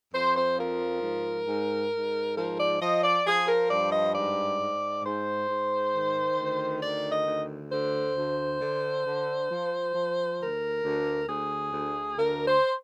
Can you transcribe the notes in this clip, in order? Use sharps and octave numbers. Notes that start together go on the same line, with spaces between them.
F2 C5
C5
F3 A#4
G#2
G#2
G#2
F3 A#4
D5
F3 D#5
D5
F3 G#4
A#4
G2 D5
D#5
G#2 D5
G#2
G#2 C5
G#2
D#3
D2
D#3 D5
D#5
D2
D3 C5
D2
D3
D3
F3
F3
D2 A#4
D2
D2 G#4
D2
D2 A#4
C5